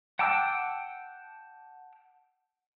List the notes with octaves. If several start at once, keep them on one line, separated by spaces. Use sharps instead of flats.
F#5 G5 A5 D6 E6